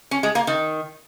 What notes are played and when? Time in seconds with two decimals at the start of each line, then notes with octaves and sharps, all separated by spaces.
0.11 C#4
0.23 G#3
0.35 A#3
0.47 D#3